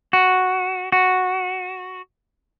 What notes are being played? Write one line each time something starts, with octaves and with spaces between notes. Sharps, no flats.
F#4
F#4